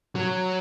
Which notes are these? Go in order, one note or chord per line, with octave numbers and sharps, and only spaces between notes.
F#3